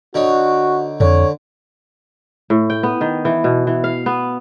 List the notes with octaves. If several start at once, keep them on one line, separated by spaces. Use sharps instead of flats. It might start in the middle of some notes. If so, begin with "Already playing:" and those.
D3 D#4 F#4 C#5
F2 D3 C#5
A2
G5
B3
D#3
E3
B2
E3
F5
B3